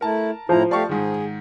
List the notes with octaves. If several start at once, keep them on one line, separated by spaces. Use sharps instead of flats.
A3 E4 A#4 A5
A2 F3 E4 A#5
A3 G4 D5 F5 A5 C#6
G#2 D#3 G#4